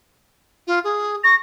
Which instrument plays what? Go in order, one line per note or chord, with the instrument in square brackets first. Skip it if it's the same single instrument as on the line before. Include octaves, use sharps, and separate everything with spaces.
[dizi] F4
G#4
[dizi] C#6 [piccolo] A#6